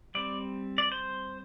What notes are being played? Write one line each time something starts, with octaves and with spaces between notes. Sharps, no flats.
G3 C4 D5
D5
C5